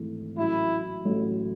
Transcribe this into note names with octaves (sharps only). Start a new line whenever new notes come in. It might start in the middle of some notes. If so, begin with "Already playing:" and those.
Already playing: G#1 G#2 E3 A3
A1 A2 F#3 E4
A1 A2 F#3